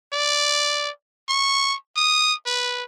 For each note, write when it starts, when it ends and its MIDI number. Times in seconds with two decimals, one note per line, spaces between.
0.13 0.90 74
1.29 1.76 85
1.96 2.34 87
2.46 2.83 71